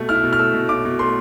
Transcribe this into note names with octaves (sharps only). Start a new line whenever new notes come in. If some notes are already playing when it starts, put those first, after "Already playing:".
Already playing: B2 A3
E4 F6
B2
F6
A3 E6
B2
E4 D6
B2
A3 C6